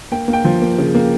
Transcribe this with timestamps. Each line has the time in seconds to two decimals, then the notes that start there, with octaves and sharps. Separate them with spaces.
0.12 A#3 G5
0.28 A#3
0.33 G5
0.45 F3
0.62 A#3
0.78 C#3
0.95 A#3